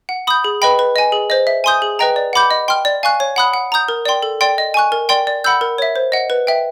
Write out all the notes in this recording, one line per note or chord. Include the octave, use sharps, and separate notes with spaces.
F#5
B5 D#6 G6
G#4
B4 D#5 G5 B5
B4
D#5 G#5
G#4
C5 D#5
E5
G#5 C6 D#6 G6
G#4
B4 D#5 G5 A#5
D5
F#5 B5 D6 G6
D#5
G5 C6 F6
D5
F5 G#5 C#6 F#6
C#5
F#5 B5 D#6 F#6
F#5
A#5 D#6 G6
A#4
D5 G5 C6
A4
D5 G5 C6
D#5
G#5 C#6 F#6
A#4
D5 G5 C6
D5
F#5 B5 E6 G6
A#4
C#5 E5
C5
D#5 F#5
B4
E5 G5